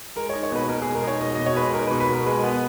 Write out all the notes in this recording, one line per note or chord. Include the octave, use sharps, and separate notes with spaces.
G#3 A#4
D#4 C#5
C#5
B2 B4
B2 A#4
G#4
G#3
A#4
D#4 C#5
B2 D#5
B2 D#5
C#5
G#3 B4
D#4 A#4
B2 B4
B4
B2 A#4
G#3 B4
B3